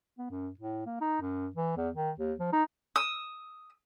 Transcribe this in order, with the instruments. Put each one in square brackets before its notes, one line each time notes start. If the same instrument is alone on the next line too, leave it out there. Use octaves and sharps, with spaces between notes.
[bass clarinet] B3
F#2
A2
A#3
D#4
F#2
E3
E2
D#3
D#2
F3
D#4
[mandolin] D#6 E6